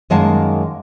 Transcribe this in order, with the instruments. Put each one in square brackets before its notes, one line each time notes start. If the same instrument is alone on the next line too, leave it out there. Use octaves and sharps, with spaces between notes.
[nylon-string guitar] F#2 D#3 G#3 A#3 F#5 A5